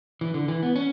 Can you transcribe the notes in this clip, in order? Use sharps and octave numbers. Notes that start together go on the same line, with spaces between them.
E3
D3
E3
B3
C#4